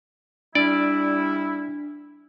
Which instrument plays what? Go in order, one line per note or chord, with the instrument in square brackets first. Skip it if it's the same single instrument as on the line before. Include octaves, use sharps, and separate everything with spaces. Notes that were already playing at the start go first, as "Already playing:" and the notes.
[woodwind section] G3 E4 [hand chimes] D4 [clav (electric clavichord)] D5